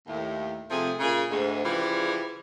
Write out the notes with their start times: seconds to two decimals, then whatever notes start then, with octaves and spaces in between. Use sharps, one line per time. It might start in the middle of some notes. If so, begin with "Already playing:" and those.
0.07 D#2 A2
0.69 C3 F3 A3 G#4
1.00 A#2 C#3 G#4
1.29 D2 G#2
1.63 C#3 E3 F3 G3